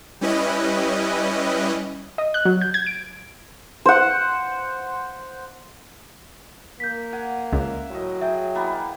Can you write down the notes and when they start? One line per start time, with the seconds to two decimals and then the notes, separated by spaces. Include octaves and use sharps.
0.21 G3 C#4 E4 B4 D#5
2.18 D#5
2.34 F#6
2.45 F#3
2.61 G6
2.74 G#6
2.86 D7
3.86 C5 F#5
6.80 A#3 G6 B6
7.13 F#5 G#5
7.52 C#2 E5
7.91 A2 F#3 D#5
8.21 G#4 E5 G5
8.55 E3 A#3 B3